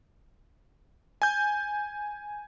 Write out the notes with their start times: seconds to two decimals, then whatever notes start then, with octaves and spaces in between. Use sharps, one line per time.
1.22 G#5 G6